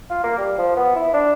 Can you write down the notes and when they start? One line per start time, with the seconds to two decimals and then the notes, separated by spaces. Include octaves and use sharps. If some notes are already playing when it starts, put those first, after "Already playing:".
0.10 F4
0.24 A#3
0.38 G3
0.58 F3
0.76 B3
0.96 E4
1.14 D4